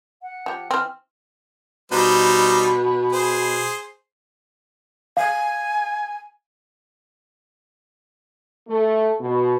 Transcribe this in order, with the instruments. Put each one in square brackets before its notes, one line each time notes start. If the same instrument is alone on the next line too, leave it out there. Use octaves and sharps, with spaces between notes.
[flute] F#5
[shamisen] F3 G4
[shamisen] E3 C4 [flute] F6
[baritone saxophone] B2 [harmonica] G3 D#4 C5
[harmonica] G#4 C5
[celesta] F5 [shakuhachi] G#5
[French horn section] A3
B2